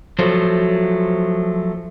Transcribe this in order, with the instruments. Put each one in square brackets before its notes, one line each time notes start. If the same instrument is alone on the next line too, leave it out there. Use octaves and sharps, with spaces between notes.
[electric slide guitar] F3 F#3 A3 C5